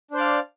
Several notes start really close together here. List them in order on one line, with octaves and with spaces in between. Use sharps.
D4 C5 D5 F5